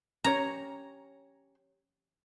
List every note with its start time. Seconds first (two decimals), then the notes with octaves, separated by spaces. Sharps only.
0.24 C#4 G4 C#5 A#5